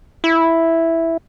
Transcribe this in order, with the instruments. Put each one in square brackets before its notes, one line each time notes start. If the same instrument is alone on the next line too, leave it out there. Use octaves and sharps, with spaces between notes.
[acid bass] E4